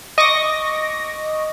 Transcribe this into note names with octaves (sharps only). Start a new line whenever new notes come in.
D#5 C#6 D6 A#6